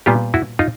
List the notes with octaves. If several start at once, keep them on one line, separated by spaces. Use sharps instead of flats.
A#2 G3 B3 F4 G4
E4 F#4
D#4 F4